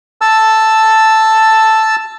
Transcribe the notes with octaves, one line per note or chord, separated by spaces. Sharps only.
A5 E6